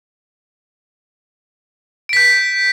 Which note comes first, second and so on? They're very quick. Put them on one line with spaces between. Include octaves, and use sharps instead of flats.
D7 B6 G6